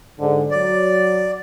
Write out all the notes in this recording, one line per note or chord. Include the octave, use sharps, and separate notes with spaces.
G#2 D3
F#3 D5